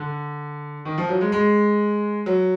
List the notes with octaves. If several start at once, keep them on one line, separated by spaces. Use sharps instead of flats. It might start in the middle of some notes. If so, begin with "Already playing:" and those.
Already playing: D3
D#3
F3
F#3
G#3
G#3
F#3